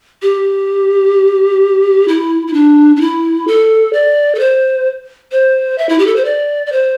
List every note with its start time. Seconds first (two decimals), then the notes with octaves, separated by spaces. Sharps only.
0.22 G4
2.08 E4
2.47 E4
2.53 D4
2.96 D4
3.01 E4
3.47 A4
3.93 D5
4.35 A4
4.39 C5
5.32 C5
5.78 E5
5.89 E4
5.99 G4
6.07 A4
6.16 C5
6.25 D5
6.66 D5
6.72 C5